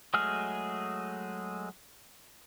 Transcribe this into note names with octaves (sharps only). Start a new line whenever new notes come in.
F#3 G#3 A3 G#4 F6